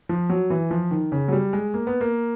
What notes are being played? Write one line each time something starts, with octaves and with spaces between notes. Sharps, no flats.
F3
F#3
E3
F3
D#3
C#3
F#3
G3
G#3
A#3
B3
A#3